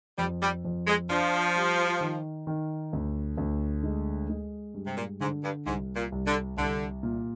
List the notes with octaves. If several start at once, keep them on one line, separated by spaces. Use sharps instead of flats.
F2 G3
G3
F2
G#3
F3 D4
G3
D#3
D#3
D2
D2
G#3
G#3
G2
C3
A#2
G#2 D3
G2
C2 G#2
A#2
C2
D3
C2 D3
A#2